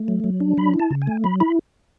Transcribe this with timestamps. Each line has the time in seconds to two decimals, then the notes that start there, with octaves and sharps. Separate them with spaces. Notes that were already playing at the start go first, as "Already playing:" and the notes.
Already playing: A3
0.08 F#3
0.24 F#3
0.40 D4
0.57 F#3 B5
0.74 E4
0.79 A5
0.91 C#3
1.02 G#5
1.07 A3
1.24 F#3 B5
1.40 E4 B5